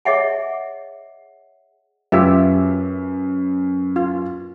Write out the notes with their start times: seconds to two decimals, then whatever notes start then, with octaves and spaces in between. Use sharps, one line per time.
0.05 G#4 C#5 D#5 E5 F#5 G#5
2.12 F#2 F4 G4 B4 E5
3.96 F4